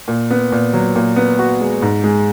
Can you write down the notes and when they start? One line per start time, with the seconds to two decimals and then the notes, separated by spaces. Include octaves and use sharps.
0.08 A#2
0.31 B3
0.52 A#2
0.73 F#3
0.96 A#2
1.16 B3
1.39 F#4
1.61 G#3
1.82 G#2
2.04 G#3